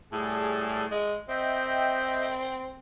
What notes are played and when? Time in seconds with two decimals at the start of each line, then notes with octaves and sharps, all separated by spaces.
0.13 A2 G3 G#4 A5
0.91 G#3
1.29 C4 D#5 E5 G5